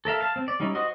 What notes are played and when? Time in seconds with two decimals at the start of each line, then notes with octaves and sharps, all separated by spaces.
0.05 A4 A#4 E5 F5
0.21 F5 A5
0.36 C4
0.48 D5
0.60 G3 C#4 D#4 E4
0.75 F#4 C5 D#5